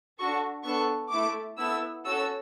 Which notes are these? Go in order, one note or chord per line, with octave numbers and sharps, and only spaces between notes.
D4 F#4 A4 C#6
B3 D4 A4 C#6
A3 E4 A4 D6
B3 E4 A4 E6
C#4 F#4 A4 E6